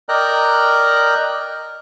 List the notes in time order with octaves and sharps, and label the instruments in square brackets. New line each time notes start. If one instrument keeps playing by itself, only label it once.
[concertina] A#4 D5 D#5 G5 A#5 F#6